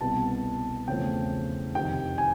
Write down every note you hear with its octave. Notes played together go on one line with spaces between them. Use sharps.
C2 B2 G3 B3 A5
E2 C#3 F3 A3 C4 G5
F2 C3 D#3 G5
G#5